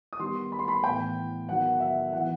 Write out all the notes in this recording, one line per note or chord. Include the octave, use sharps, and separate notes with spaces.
D#6
D#3 G3 B3 C6
B5
C6
B5
A2 E3 B3 G5
D#3 F#3 B3 F#5
E5
E3 B3 F#5